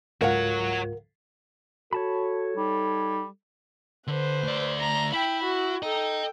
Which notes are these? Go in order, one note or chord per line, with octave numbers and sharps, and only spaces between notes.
C#2 G#2 F4 F#4 A#4 C#5 F5 F#5
F#4 A4 C#5 A5 B5
G3 D#4
D3 B4 C5
D2 D5
A#5
E4 G5 B5
F#4
A4 D#5 G5 A#5